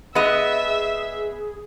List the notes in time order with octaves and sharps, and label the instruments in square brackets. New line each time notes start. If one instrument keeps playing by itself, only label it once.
[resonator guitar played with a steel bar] B3 D#5 [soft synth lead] G#4 [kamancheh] E5